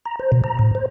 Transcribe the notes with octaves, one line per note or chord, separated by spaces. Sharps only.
A#5
C5
B2
A#5
A2
C5